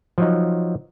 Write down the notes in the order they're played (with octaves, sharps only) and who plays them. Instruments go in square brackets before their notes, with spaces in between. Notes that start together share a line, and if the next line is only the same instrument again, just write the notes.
[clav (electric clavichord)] F3 F#3 D#4